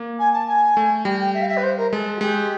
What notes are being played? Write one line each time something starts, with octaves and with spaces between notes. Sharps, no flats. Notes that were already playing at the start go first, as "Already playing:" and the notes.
Already playing: A#3
G#5
A5
G#5
A3
G3 G5
G5
E5
F5
E5
B4
C5
A#4
G#3 A4
F#4
G#3 G4